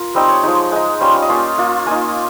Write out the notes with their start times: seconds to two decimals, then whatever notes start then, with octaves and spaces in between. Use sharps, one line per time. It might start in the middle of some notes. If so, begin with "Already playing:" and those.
Already playing: F4 A#4
0.15 G3 C4 D#4
0.29 C#5
0.43 F3 G#3 D#4
0.72 G#3 D#4
1.00 G3 C#4 F4 C5
1.15 F5
1.22 D#5
1.29 A#3 C#4 F4 F5
1.58 A#3 F4
1.87 A#3 D#4 G#5